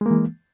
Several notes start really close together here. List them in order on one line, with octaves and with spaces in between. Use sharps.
G#3 A#3 E3